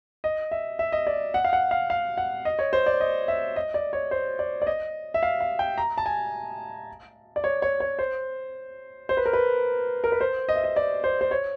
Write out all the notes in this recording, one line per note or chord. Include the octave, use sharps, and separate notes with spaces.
D#5
E5
E5
D#5
D5
F#5
F5
F#5
F5
F5
F#5
D#5
C#5
C5
D5
D#5
E5
D#5
D5
C#5
C5
D5
D5
D#5
E5
F5
F5
G5
A#5
A5
G#5
D5
C#5
C#5
C#5
C5
C5
B4
A#4
B4
A#4
B4
C5
D#5
E5
D#5
D5
C5
C5
C#5